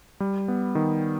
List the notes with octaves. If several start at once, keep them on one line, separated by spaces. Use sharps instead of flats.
G3
B3
D#3